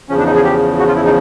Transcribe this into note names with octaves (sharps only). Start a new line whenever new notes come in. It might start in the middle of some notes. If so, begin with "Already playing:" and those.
E2 C#3 F3 C#4
D4
D#4
G#4
G4
F#4
F4
E4
D#4